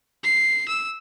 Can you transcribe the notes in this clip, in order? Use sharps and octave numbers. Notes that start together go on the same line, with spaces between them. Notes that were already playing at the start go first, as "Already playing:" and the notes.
C7
E6